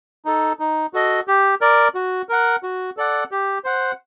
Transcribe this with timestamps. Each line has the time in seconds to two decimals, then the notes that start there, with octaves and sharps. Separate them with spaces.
0.25 D#4 A4
0.59 D#4
0.93 F#4 A4 D#5
1.28 G4
1.61 A#4 D5
1.95 F#4
2.29 A#4 F#5
2.63 F#4
2.97 A4 D5 F#5
3.31 G4
3.64 C5 F#5